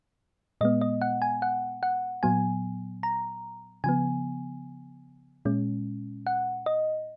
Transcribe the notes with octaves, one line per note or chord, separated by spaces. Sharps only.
A#2 G#3 B3 D#5
D#5
F#5
G#5
F#5
F#5
A#2 F#3 B3 G#5
A#5
C#3 F3 B3 G#5
A#2 G#3 C#4
F#5
D#5